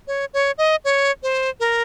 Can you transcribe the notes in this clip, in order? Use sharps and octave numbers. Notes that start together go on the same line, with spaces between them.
C#5
C#5
D#5
C#5
C5
A#4